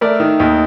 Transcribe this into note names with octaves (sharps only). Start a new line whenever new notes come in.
A3 A#4 D5
D#3
D#2